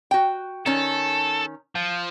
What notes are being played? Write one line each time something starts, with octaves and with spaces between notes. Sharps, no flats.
F#4 G5
D#3 C#4 A4
F3